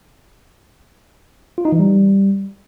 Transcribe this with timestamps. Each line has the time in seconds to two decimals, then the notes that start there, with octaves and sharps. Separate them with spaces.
1.58 F4
1.65 D#4
1.72 E3
1.80 G3